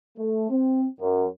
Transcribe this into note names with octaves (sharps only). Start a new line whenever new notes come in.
A3
C4
F#2